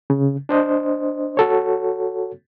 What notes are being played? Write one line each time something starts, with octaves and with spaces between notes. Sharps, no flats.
C#3
D4 C5 D#5
F#4 A4 C#5